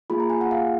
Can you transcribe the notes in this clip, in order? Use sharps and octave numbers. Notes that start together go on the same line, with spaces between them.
A#3 F4 G#4 B5
A#5
G#5
F#5
F5